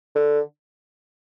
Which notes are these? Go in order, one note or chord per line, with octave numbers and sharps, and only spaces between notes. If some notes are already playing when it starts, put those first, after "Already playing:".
D3